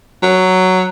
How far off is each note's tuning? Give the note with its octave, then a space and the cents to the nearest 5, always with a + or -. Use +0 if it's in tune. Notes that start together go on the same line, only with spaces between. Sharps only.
F#3 +5